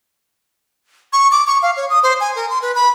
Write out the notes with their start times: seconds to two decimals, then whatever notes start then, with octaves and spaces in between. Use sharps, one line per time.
1.13 C#6
1.31 D6
1.47 C#6
1.62 F5
1.77 C#5
1.90 D#6
2.03 C5
2.20 G#5
2.35 A#4
2.50 C6
2.62 B4
2.75 B5